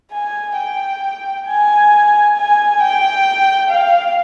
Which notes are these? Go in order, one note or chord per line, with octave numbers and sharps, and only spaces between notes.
G#5
G5
G#5
G#5
G5
F5